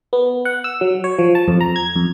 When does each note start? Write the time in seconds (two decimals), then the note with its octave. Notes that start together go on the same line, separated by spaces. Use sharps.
0.13 B3
0.45 F#5
0.64 E6
0.81 F#3
1.04 C#5
1.19 F3
1.35 A5
1.48 F2
1.61 A#5
1.76 G#6
1.96 F2